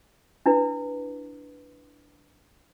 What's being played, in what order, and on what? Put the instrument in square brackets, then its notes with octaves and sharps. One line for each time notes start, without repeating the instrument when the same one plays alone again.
[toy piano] D4 E4 B4